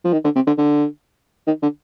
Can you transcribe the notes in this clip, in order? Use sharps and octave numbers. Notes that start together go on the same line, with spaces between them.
F3
D#3
D3
C3
D3
D3
D#3
D3